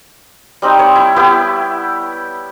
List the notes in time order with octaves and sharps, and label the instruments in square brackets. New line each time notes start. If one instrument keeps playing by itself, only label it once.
[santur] G3 C4 D#4
C#5
E4
B3 E4 G4